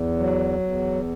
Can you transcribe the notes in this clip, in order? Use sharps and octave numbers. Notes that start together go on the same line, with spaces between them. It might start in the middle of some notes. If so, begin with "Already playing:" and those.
Already playing: E2
F#3
E2